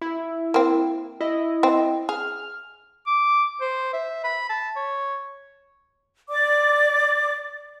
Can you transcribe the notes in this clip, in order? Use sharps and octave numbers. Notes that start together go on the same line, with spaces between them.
E4
A#3 C4
E4 D#5
C4
G#4 F6
D6
C5
E5
B5
A5
C#5
D5 D6